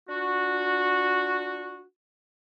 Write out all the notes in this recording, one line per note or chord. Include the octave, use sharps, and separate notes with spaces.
D4 F4 F#4